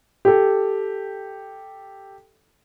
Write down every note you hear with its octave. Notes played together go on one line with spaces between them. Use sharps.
G4 A4